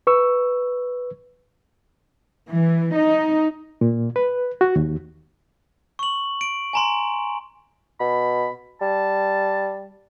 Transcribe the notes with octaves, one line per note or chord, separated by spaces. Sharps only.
B4 C#6 E6
E3
D#4
A#2
B4
F#4
D#2
C#6 F#7
D7
G#5 A#5 C6
B2 B5
G3 A5